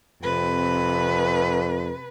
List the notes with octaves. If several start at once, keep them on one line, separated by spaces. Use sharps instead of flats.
F2 C3 B4